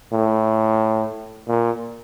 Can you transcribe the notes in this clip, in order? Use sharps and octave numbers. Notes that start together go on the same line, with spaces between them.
A2
A#2